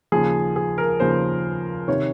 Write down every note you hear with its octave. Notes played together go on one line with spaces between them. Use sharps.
D#2 C#3 F3 G#4
G#4
A#4
D#2 C#3 F3 C5
C3 D#3 C#5